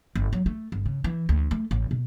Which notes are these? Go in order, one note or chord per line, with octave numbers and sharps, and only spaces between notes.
G1
F#3
A3
G1
C#3
E3
D2
A3
A1
B2